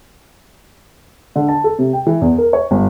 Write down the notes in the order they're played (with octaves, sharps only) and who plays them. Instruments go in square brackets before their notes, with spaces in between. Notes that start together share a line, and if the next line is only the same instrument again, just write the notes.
[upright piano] D3
A5
A4
C3
G5
E3
E2
A#4
C#5
G1